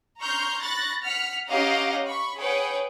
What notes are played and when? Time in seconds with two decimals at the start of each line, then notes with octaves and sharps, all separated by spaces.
0.20 A#5 C6 C#6 F6 G6
0.61 B5 C#6 F#6 A6 A#6
1.03 F#5 F6 B6 C#7
1.47 C#4 G4 D#5 F5 F#5 A#5
2.04 B5 C#6
2.37 G#4 B4 C#5 F#5 G5